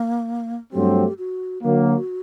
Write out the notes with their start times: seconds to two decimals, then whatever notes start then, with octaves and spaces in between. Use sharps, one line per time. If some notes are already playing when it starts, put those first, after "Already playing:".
Already playing: A#3
0.73 G2 F#3 A3 C4 G4
1.18 F#4
1.63 D3 F#3 A#3 F#4